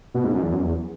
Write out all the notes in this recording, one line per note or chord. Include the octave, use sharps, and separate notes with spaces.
B2
G#2
F#2
E2
F#2
E2